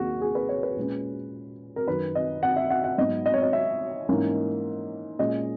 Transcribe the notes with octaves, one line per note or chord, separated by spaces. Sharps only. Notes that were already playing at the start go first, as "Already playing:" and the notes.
Already playing: D#2 D#3 A#3 F#4 G#4
G#4
B4
C#5
B4
A#2 G#3 C#4
A#4
F#2 D#3 F#3 B4
D#5
F#5
E5
F#5
F#5
G#2 F#3 B3 D#5
D#5
C#5
D#5
E5
G#2 E3 A#3 C#4
A#2 G#3 C#4 D#5